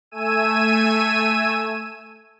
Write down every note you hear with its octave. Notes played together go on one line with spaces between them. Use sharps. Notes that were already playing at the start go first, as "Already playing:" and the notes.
A3 G#5 E6 D#7